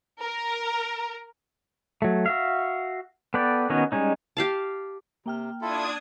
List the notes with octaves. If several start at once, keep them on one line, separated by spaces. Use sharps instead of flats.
A#4
F#3 A3
F#4 E5 F5
B3 A4 B4 D5 G5
D#3 B3 C#4 D#4 F#4
G3 G#3 C#4 D#4
G4 F5 A5
C3 A#3 G5 F6
D4 E4 F4 A4 D#6 G#6